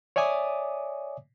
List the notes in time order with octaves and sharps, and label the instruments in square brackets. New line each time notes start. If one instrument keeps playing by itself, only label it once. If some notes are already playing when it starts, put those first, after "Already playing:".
[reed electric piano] C#5 D5 E5 G#5 D6 D#6